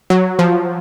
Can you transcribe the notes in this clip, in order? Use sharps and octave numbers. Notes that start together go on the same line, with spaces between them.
F#3
F3